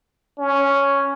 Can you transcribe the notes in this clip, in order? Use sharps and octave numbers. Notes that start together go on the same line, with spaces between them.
C#4